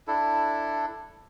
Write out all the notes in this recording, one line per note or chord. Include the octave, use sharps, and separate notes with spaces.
D4 E4 A4